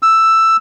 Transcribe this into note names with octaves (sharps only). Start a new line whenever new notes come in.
E6